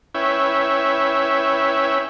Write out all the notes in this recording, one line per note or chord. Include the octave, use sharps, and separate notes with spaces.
C#4 E4 B4 C#5 E5 G5